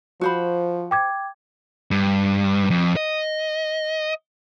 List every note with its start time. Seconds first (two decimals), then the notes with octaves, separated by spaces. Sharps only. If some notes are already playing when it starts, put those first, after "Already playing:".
0.21 F3 F#4 C5 B5
0.91 G5 D6 G#6
1.91 G2
2.71 F2
2.97 D#5